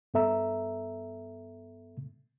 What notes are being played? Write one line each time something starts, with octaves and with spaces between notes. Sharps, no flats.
G2 B3 A4 E5 A#5 E6